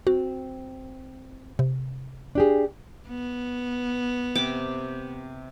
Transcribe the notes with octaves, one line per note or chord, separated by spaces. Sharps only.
C4 F#4
C3
D4 G4 G#4
B3
C3 G5 D6